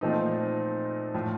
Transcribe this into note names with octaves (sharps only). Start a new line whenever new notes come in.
A#2 F3 A3 C4 D#4
A2 F3